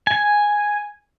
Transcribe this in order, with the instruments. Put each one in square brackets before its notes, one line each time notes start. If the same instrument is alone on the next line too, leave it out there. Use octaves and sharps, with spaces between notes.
[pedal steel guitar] G#5